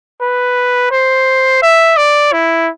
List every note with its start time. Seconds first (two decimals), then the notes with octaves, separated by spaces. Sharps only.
0.22 B4
0.91 C5
1.62 E5
1.97 D5
2.32 E4